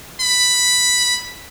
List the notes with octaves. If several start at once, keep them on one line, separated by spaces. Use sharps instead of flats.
B5